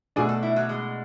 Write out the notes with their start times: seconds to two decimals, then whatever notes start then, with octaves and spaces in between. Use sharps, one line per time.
0.16 B2 A3 D4 G#4
0.29 A4
0.43 E4
0.56 F#3
0.69 G#3